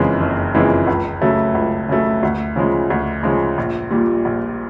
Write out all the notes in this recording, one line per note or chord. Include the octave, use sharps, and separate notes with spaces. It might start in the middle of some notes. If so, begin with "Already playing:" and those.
Already playing: F#1 F2 C#3 E3 G#3
F#1
F2 C#3 E3 G#3
C#2
C#3 F#3 A3
C#2
C#3 F#3 A3
D2
C#3 F3 G#3
D2
C#3 F3 G#3
A#1
A#2 G3
A#1